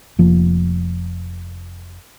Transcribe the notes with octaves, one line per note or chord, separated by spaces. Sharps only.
F1 F3 A#3